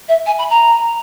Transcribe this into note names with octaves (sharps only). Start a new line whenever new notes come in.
E5
G#5
B5
A#5